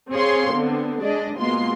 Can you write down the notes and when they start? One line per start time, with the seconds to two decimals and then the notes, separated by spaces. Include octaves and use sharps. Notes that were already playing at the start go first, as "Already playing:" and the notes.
0.11 C4 G#4 C#5 F5 C6
0.53 D3 B3 C4
1.03 G#3 D4 G#4 D5 D#5
1.37 B2 G#3 A#3 F4 C6